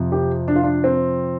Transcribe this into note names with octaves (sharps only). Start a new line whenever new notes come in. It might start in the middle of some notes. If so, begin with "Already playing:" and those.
Already playing: F2 C3 F3
G4
D4
F4
D4
C4